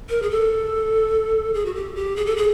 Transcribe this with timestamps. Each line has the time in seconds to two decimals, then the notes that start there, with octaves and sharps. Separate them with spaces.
0.10 A#4
0.22 G#4
0.31 A4
1.54 G#4
1.65 F#4
1.75 G4
1.95 G4
2.16 G#4
2.26 A4
2.37 G#4